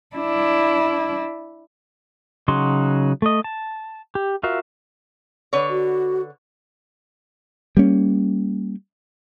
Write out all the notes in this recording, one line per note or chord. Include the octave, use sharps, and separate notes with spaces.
D4 E4
C#3 F#3 D#4 F#4 C6
A3 D#5
A5
G4
F4 F#4 A#4 E5 F5
D3 B4 C#5
F#4
G3 A#3 C#4